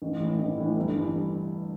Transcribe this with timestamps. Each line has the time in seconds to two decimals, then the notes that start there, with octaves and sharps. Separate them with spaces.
0.02 A1
0.20 A2 E3
0.39 A1
0.58 A2 E3
0.77 G1
0.95 G2 E3